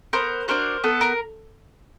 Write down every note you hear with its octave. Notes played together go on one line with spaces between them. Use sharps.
B3 A#4 C5
D4 F#4 A#4 C5
B3 A4
A#4